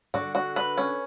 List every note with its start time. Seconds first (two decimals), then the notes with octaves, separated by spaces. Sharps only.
0.14 D3 F#4
0.35 F#4
0.56 B4
0.78 C#4